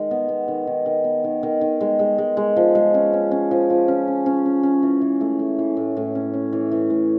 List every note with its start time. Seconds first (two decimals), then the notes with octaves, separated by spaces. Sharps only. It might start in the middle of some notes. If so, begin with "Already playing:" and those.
Already playing: D#3 G#3
0.11 B3
0.29 B3
0.48 D#3
0.67 D#3
0.86 D#3
1.04 B3
1.24 D#3
1.43 D#3
1.61 D#3
1.81 G#3
1.99 G#3
2.18 G#3
2.37 G#3
2.57 F3
2.75 G#3
2.94 C#4
3.13 C#4
3.31 C#4
3.51 F3
3.70 F3
3.88 C#4
4.08 C#4
4.26 C#4
4.46 C#4
4.63 C#4
4.83 E3
5.02 E3
5.21 A3
5.39 A3
5.59 E3
5.77 A2
5.97 A2
6.15 C#4
6.34 C#4
6.53 E3
6.71 E3
6.90 A2